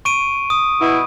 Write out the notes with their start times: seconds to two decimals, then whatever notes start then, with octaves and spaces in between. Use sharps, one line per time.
0.05 C#6 D7 D#7
0.50 D#6
0.80 B2 E4